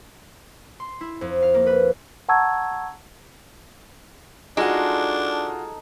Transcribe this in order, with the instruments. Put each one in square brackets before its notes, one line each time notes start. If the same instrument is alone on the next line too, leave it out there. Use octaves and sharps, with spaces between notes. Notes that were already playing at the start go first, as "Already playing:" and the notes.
[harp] C6
E4
F2
F5
A#3
B4
[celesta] F#5 A5 A#5 C#6 E6 G#6
[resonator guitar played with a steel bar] G#3 [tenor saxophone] D4 [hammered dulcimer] D#4 A4 [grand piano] F4 F#4